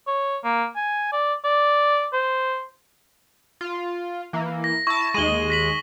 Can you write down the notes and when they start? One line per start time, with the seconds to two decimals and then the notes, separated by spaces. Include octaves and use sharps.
0.07 C#5
0.44 A#3
0.76 G#5
1.12 D5
1.45 D5
2.13 C5
3.61 F4
4.33 E3 A#3
4.64 A#6
4.87 E4 A5 C#6
5.14 D#2 G#3 D#7 F#7 G7
5.50 A#6 B6 F#7